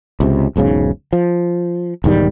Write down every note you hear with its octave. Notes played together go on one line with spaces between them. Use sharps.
C#2 C3
E1 B1 G#2 C#3
F3
E1 G#2 D#3 G3